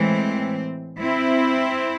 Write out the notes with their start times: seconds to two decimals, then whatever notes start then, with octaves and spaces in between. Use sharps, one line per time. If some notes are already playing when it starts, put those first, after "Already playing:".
Already playing: A2 E3 G#3 C4
0.99 C4 E4